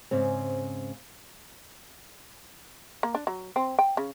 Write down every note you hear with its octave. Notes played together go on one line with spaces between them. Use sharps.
G#2 C#3 C4
A#3
D4
F#3
C4
G5
C#3